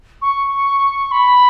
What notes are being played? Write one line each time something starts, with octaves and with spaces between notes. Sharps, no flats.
C#6
B5